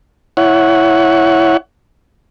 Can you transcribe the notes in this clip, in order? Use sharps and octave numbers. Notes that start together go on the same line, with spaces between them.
E4 C#5 F#5